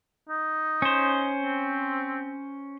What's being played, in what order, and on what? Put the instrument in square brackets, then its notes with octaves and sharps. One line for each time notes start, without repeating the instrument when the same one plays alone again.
[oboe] D#4
[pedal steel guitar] C#4 C5
[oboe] C4